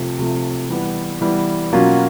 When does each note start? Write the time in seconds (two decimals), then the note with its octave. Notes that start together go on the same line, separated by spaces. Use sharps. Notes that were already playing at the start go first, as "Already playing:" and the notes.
Already playing: C3 F3 A3
0.19 C3 F3 A3
0.70 E3 G3 B3
1.21 E3 G3 B3
1.72 B2 F#3 A#3 C#4 F4